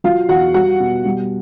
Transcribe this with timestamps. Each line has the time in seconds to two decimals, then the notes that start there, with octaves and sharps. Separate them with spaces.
0.04 F#3 F4 F5
0.29 E2 F#4 F#5
0.54 G3 F#4 F#5
0.80 B2
1.05 G3